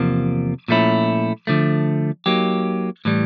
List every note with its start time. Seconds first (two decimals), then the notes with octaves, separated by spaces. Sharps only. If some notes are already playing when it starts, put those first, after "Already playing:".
Already playing: E2 C3 F3 A#3
0.68 A#2 F3 A3 C#4 E4
1.47 D3 F3 A3
2.26 F#3 A#3 D#4 G4
3.05 A2 E3 G3